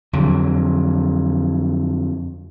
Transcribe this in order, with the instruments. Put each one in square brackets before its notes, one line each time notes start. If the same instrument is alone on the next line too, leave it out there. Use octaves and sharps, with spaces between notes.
[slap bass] F2 D3 F#3